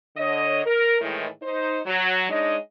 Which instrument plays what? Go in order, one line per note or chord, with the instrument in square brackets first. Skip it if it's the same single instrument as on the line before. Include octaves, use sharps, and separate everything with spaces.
[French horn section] D3 C#5 D#5
A#4
A2 D#3 E3 G#3
D#4 C5
F#3
G#3 D4 D#4 C#5 D#5